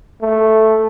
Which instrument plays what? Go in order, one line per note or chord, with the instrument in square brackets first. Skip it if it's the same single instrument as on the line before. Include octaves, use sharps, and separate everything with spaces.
[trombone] A3